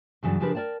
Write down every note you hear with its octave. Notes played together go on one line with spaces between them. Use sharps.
G2 C#3 E3 F#3 D5
C#3 F3 D4 G4 A#4 B4
A#4 C5 D5 G5 A5